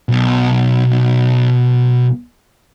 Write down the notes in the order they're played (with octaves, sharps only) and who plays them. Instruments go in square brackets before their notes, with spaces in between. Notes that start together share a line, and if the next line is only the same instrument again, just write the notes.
[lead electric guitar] B1 B2